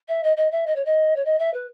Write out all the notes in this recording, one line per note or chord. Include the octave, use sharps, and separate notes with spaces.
E5
D#5
D#5
E5
D#5
C#5
D#5
C#5
D#5
E5
B4